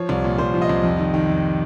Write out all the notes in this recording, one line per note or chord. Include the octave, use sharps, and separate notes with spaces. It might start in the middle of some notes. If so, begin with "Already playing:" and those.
Already playing: F3 C#5
C2
A#2
C2 C5
F3
D#5
C2
F2
D#3
D#3
F2